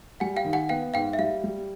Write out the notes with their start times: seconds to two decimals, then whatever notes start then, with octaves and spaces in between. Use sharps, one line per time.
0.20 G3 F#5 G#5
0.36 F5 G5
0.45 D#3
0.53 F#5 G#5
0.69 B3 F5 G5
0.94 G#2 F5 G5
1.13 E5
1.18 G3 F5
1.44 G3